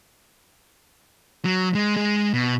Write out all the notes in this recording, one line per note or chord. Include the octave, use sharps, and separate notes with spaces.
F#3
G#3
G#3
B2